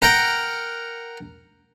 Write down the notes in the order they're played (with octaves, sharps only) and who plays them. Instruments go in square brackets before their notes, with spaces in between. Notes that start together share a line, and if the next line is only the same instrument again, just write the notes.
[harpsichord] A#4 F#5 G5